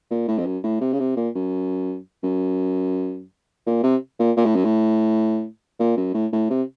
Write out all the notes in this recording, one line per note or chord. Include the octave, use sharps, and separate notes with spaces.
A#2
A2
F2
F#2
A2
C3
C#3
C3
A#2
F#2
F#2
A#2
C3
A#2
A#2
A2
F#2
A2
A#2
F#2
A2
A2
C3